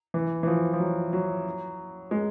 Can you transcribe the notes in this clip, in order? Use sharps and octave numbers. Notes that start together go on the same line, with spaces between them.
E3
E3
F3
F3
F#3
F#3
G#3